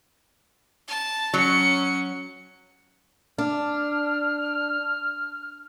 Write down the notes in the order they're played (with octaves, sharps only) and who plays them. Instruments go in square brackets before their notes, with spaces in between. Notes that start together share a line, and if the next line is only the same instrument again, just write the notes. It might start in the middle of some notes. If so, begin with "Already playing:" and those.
[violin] A5
[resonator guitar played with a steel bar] F#3 [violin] C#4 C#7
[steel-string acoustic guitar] D4 [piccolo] F6